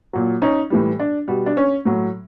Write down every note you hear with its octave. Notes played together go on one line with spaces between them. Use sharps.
A#2 F#3
C#4 D#4
A2 E3 G3
D4
B2 G3
D4
C#4
A2 F#3